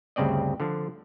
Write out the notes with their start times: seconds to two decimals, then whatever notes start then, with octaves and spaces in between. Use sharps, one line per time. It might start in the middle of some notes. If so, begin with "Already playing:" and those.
0.16 D2 G2 C#3 C4 D5 D#5
0.60 D3 F3 D4